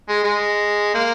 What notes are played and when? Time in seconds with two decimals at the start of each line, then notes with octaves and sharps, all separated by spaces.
0.09 G#3
0.24 G#3
0.95 A#3